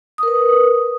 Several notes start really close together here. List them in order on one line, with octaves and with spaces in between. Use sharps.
D#6 A#4 B4